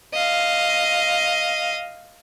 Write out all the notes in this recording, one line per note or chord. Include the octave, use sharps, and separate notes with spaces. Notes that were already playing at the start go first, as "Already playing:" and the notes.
D#5 F5